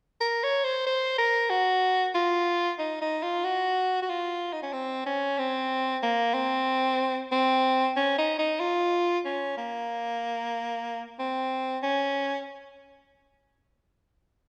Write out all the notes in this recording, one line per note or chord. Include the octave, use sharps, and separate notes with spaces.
A#4
C#5
C5
C5
A#4
F#4
F4
D#4
D#4
F4
F#4
F#4
F4
D#4
C#4
C4
C#4
C4
A#3
C4
C4
C#4
D#4
D#4
F4
C#4
A#3
C4
C#4